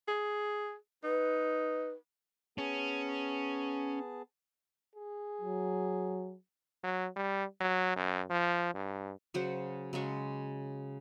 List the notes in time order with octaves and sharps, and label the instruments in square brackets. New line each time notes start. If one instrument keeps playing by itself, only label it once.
[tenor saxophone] G#4
[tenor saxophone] D#4 [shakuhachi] B4
[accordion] B3 G#4 A5 [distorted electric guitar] C#4
[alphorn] G#4
[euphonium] F#3
[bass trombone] F#3
G3
F#3
F#2
F3
G2
[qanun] C#3 F#3 C5 F#5
C#3 F#3 G#3 C#6